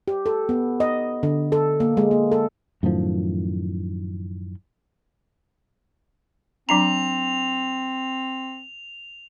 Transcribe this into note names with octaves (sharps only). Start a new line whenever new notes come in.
G4
A4
B3
D#5
D3
A4
A#3
G#3
A#3
A4
F#2 A2 D#3 F3
F#3 C4 D4 A#5 F7